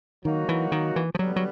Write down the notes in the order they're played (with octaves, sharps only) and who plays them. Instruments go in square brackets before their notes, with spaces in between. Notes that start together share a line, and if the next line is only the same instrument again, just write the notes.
[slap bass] D#3 [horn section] F#3 A#3 D#4 F#4
[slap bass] E3
D#3
E3
F3
[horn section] D3 G3 B3 [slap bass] F#3
[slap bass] F#3